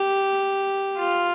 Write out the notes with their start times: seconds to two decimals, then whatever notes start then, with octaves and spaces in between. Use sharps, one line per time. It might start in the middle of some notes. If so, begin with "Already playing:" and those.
Already playing: G4
0.98 F4